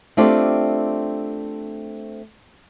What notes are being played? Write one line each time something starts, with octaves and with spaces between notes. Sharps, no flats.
A3 C4 D4 F4 G4 D5